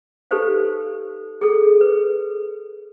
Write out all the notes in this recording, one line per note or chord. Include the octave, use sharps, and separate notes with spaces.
D#4 G4 A4 B4 C5 F5
G#4 A4
B4